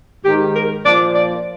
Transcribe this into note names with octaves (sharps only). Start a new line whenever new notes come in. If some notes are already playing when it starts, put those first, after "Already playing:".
G#2 D#3 G4
A#4
A#2 F3 D5
D5